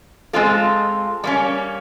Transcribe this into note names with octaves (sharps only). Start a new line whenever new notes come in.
G#3 C4 F4 A4
G3 A#3 C#4